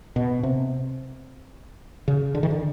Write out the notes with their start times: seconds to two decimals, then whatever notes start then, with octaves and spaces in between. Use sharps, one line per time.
0.16 B2
0.43 C3
2.08 C#3
2.35 D3
2.43 D#3
2.50 D3